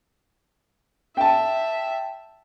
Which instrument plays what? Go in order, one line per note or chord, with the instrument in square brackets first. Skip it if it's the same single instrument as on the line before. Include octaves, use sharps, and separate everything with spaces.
[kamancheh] E5 [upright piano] G5 A5